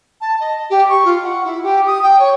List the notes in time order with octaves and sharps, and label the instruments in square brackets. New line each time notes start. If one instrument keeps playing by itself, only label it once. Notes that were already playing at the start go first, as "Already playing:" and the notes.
[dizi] A5
D#5
G4
C#6
F4
F#5
E4
G4
D#6
G5
C#5